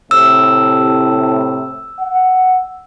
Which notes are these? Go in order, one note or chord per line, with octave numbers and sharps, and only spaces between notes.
A2 C3 E6
F#5